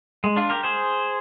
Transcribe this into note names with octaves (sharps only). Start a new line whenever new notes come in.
G#3
D4 F4
G4 A#4
G#4 C5